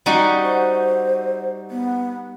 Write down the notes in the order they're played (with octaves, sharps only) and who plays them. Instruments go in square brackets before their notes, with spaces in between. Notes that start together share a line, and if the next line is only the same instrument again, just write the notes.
[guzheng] G3 D#4 F#4
[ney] C5
B3